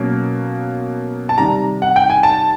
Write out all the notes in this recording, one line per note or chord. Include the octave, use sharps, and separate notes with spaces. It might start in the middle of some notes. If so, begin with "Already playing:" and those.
Already playing: B2 F#3 A#3 C#4
A5
C3 D#3 G3 A#5
F#5
G5
G#5
A5